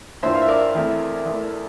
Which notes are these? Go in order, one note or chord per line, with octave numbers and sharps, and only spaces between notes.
G2 E3 A#3 F4 C5 E5
F5
E5
A#4 D5
E2 E3 A3 C4 E4
E2 E3 A3